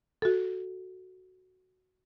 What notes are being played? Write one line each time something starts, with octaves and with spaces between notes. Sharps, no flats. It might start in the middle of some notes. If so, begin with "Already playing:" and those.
F#4 A4